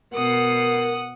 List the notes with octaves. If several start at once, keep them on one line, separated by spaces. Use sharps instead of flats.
B2 A#4 F#5 D#6